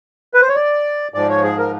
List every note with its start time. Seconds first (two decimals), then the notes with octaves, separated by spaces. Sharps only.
0.34 B4
0.41 C5
0.49 C#5
0.55 D5
1.14 G#2 F3 D5
1.29 C#5
1.43 G#4
1.58 A#4